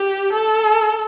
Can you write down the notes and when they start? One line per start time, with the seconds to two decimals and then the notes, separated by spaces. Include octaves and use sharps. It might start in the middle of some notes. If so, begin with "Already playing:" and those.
Already playing: G4
0.33 A4